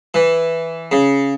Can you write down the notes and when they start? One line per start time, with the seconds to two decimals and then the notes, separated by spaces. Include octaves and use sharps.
0.14 E3
0.92 C#3